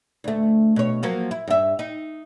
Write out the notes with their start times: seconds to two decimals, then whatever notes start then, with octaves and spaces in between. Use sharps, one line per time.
0.24 D2 A3
0.76 B2 C#5
1.03 F3 F#3 A#3
1.31 E4
1.48 G2 E5
1.79 D#4